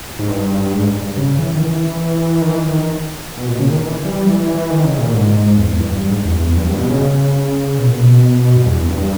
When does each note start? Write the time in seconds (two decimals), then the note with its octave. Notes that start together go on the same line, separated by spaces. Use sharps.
0.19 G#2
0.29 G2
0.73 G#2
0.89 G2
1.02 G2
1.18 C#3
1.39 E3
1.55 D#3
1.61 E3
2.42 D#3
2.49 E3
2.64 D#3
3.38 B2
3.48 A#2
3.59 C#3
3.70 D#3
3.82 E3
4.04 G3
4.26 E3
4.40 E3
4.55 E3
4.70 D#3
4.84 C#3
4.99 A#2
5.14 G#2
5.57 E2
5.71 E2
5.80 G2
6.03 G2
6.10 G#2
6.16 G2
6.25 E2
6.46 E2
6.57 G2
6.64 E2
6.68 G2
6.79 B2
6.90 C#3
7.78 B2
7.87 A#2
7.94 B2
8.56 G2
8.66 E2
8.89 G2